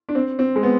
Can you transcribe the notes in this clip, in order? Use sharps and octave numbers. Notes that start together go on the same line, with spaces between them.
D4
C4
C4
G#3
B3